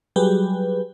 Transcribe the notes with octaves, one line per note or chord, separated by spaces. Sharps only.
F#3 G3 G4 G#4 B4